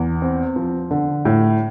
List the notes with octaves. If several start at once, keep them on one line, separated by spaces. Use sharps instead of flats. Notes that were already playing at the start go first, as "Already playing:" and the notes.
Already playing: E2
C4
F3
D3
A2